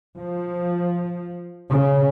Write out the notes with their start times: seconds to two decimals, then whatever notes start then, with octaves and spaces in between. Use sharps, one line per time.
0.18 F3
1.72 C#3